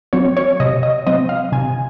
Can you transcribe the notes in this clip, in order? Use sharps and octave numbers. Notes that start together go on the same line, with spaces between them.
F#3 C4 C#5
C#5
C3 D#5
D#5
F#3 C4 D#5
F5
C3 G#5